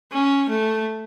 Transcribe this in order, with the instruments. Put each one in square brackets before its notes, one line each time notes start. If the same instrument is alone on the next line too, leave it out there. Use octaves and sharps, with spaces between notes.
[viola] C#4
A3